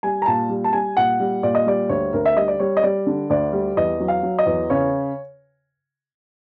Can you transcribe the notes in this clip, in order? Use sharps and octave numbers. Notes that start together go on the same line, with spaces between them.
G3 G#5
A#5
A#2 A5
G3
A5
G3 G#5
A#2 F#5
G3
A#2 D5
D#5
G3 D5
D2 C#5
D2 A#4
E5
G3 D#5
D5
G3 C#5
D#5
G3 D5
D3
D2 D5
G3
E2 D#5
F#3
F5
F#3
D#5
E2
C#3 C#5